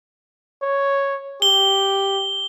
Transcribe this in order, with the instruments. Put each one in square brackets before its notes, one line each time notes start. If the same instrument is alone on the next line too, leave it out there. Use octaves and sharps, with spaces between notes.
[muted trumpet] C#5
[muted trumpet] G4 [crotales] G7